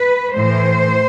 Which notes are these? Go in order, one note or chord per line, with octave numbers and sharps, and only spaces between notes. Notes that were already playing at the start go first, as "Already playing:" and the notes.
Already playing: B4
A2 E3 C5